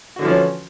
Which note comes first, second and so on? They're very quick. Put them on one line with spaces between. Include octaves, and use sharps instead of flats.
F#4 D3 E3 F3 C#4